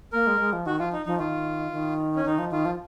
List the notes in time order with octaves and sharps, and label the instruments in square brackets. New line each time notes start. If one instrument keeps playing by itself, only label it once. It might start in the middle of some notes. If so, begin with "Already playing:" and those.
[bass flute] A#3 [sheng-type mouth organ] A#4
[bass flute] G#3
G#3
F3
[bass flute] D#3 [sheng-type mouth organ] F#4
[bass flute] F3 [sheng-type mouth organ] F4
[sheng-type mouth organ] D#4
[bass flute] F3 [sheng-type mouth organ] D#4
[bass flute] D#3 [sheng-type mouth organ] F4
[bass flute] D#3
[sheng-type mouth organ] C#4
[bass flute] D#3 [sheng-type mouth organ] D#4
[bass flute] F3
[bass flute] D#3 [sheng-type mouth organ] F4
[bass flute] F3